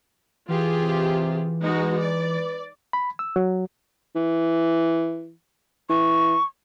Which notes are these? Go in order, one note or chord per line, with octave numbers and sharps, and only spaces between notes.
E3 F4 G4 G#4
C3
G#3 D#4 F#4 B4
D5
B5
E6
F#3
E3
E3 C#6